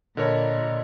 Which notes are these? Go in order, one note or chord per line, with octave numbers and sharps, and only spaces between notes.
A#2 D3 A#4 C#5 D#5 B5